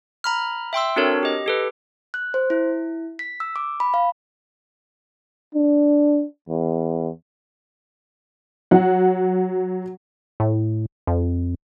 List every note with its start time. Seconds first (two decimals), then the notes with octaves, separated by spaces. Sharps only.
0.24 A#5 B5 F6
0.73 E5 G5 C6 E6
0.96 C4 D4 F#4 A4 A#4 C#5
1.23 G4 D#5
1.46 G4 A4 B4
2.14 F#6
2.34 C5
2.50 E4
3.19 B6
3.40 E6
3.56 D6
3.80 B5
3.94 F5
5.55 D4
6.49 E2
8.71 F#3 F#5
10.40 A2
11.07 F2